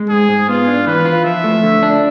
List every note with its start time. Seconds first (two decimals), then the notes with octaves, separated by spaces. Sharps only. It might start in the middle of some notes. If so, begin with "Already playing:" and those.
Already playing: G#3
0.09 G#2 G#4
0.29 G#2
0.48 B3 F4
0.68 D4
0.86 E3 B4
1.05 F4
1.24 F3 E5
1.44 A3
1.63 D3
1.83 D4